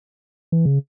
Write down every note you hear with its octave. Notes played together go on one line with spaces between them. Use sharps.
E3
C#3